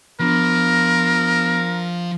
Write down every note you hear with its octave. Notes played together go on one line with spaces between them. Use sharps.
F3 B3 D4 A#4